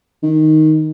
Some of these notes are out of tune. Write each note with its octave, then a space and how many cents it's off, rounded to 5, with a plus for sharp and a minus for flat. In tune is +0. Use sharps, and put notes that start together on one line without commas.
D#3 +0